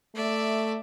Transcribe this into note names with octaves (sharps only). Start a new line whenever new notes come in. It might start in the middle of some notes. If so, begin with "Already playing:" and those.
A3 D5 E5